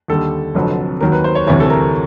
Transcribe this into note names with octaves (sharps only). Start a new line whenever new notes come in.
D#2 D3 G3 A4
F1 F2 D3 F#3
D#2 D#3 F#3 A#4
B4
C5
C#5
D2 C3 E3 G3 C#5
A4
A#4